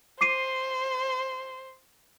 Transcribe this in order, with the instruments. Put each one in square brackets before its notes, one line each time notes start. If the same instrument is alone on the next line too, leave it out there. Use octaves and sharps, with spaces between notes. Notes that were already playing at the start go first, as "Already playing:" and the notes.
[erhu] C5 [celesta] D6 C7 D#7